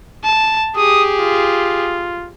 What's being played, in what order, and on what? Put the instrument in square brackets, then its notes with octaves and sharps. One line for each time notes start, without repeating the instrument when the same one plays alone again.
[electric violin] A5
[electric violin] G4 G#4 [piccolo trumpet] D#6
[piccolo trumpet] F4